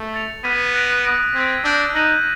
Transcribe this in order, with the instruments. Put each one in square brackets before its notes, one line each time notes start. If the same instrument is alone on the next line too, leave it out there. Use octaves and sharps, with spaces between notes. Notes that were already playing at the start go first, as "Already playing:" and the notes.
Already playing: [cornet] A3
[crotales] A6 C#7 F7
[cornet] B3 [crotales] D6 F6 G#6 B6 D#7
[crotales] F#6 A#6 D7 F7
D#6 F#6 A#6 D7
[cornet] C4 [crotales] D#6 G#6 B6
[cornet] D4 [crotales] E6 G6 A#6
[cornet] D#4 [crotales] F#6 A#6 D#7 F#7